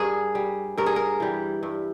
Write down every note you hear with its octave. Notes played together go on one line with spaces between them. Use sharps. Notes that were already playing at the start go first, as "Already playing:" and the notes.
Already playing: G2 G#4 A#4
G3
G2 A#4
G#4
A#4
E3 G3
G2